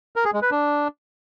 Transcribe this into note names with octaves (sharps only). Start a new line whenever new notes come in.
A#4
G#4
G#3
B4
D4